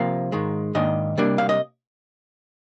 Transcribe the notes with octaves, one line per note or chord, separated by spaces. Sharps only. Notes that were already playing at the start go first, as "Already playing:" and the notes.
Already playing: C3 F3 A#3 F5
G#2 D#3 G#3
G#2 D#3 A#3 D4 D#5
C3 G3 A#3 D4
F5
D#5